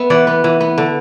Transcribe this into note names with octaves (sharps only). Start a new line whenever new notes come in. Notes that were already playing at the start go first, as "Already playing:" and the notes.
Already playing: B3 B4 E5
E3 D5 F#5
B3
E3
B3
D3